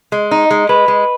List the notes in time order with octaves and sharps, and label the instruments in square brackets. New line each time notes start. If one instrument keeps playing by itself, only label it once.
[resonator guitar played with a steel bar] G#3
D#4
G#3
[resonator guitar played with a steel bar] G#3 [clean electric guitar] B4
[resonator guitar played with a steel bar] G#3